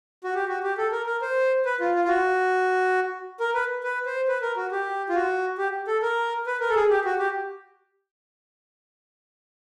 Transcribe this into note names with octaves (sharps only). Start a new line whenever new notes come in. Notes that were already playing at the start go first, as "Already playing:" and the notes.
F#4
G4
F#4
G4
A4
A#4
A#4
C5
B4
F4
F4
F4
F#4
A#4
B4
B4
C5
B4
A#4
F#4
G4
F4
F#4
G4
A4
A#4
B4
A#4
A4
G#4
G4
F#4
G4